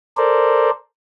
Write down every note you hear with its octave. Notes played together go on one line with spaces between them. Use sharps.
A4 A#4 C5 D5